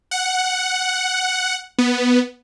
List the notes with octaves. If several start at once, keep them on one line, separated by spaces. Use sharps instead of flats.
F#5
B3